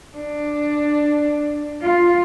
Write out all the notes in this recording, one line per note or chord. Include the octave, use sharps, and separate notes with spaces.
D4
F4